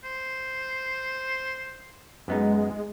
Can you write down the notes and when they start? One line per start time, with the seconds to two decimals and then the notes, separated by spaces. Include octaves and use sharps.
0.04 C5
2.28 F#2 G#3 B3 D#4